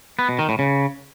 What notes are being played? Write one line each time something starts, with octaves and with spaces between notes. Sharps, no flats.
B3
B2
D#3
A2
C#3